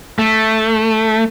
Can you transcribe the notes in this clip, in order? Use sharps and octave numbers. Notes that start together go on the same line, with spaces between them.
A3